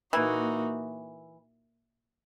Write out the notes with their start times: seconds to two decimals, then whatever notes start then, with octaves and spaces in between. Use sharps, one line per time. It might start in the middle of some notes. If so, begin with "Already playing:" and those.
0.13 A#2 E3 A#3 D#4 F#4